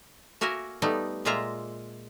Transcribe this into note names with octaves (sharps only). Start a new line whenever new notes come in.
A#3 F#4 A#4 E5 G#5
G3 A3 B3 D#4
A#2 G#3 A#3 F4 E5 A#5